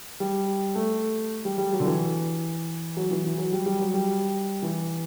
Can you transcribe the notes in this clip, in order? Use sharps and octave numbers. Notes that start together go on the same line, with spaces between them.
G3
A3
G3
G3
F#3
D3
E3
F#3
E3
E3
F#3
G3
G3
F#3
G3
E3